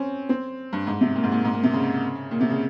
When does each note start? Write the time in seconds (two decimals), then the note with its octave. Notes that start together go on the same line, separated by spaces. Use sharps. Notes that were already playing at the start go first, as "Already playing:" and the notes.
Already playing: C4 C#4
0.29 C4
0.73 G2
0.87 G#2
1.01 C3
1.15 A#2
1.24 G#2
1.32 A#2
1.45 G#2
1.54 A#2
1.63 C3
1.73 C#3
2.31 A#2
2.41 C3
2.50 C#3